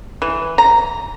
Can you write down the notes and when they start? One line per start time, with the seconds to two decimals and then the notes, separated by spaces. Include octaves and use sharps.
0.22 E3
0.58 A#5